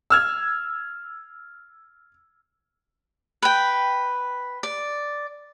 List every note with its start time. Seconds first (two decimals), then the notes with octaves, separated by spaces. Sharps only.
0.10 E6 F6 G#6
3.42 B4 G5
4.63 D5